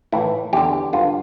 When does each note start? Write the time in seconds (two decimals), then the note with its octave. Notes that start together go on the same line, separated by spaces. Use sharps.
0.12 A2 E3 E4
0.53 E2 D3 G4
0.93 G2 D3 F4